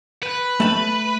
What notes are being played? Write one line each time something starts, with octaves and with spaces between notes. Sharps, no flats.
B4
A3 A5